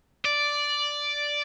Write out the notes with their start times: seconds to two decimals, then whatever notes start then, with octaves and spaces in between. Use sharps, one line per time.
0.25 D5